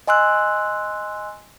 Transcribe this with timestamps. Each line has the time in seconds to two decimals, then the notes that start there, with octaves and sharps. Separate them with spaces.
0.07 D#5 G#5 C6 E6 F#6